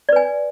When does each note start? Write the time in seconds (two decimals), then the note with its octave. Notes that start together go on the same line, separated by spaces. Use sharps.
0.09 D5
0.12 B4
0.16 G#5